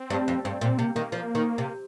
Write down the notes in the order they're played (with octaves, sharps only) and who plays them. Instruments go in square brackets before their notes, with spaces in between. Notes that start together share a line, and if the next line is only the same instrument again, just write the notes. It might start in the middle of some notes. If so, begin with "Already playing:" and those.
Already playing: [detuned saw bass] C4
[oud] G2
F2
[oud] G2 [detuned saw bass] C4
[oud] A#2 [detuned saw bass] C4
[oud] C3 [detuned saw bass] A#3
[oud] D#3 [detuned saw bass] A#3
[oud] F3
D#3
C3